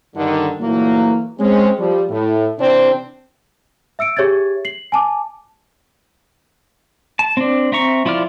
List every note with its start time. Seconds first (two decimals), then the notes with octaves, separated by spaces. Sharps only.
0.16 G2 D3 D#3
0.61 A#2 E3 F#3 A3 A#3
1.39 G#3 C4 C#4
1.79 F3 G3
2.10 A2
2.59 C3 E3 C4 D4
3.99 E5 E6 C#7 D7
4.17 G4 G#4 C#5 E5 G#6 A6
4.65 C7 F#7
4.92 G#5 A5 D6
7.19 A5
7.37 C4 D4
7.72 C4 E5 A#5 C#6
8.05 F3 E4 F4 D5 F6